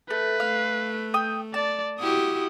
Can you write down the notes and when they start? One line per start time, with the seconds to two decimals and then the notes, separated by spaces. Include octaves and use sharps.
0.10 A3 B4
0.40 A3 F5
1.14 G5 D#6
1.54 D5 A5
2.00 E4 F#4 G4 D#6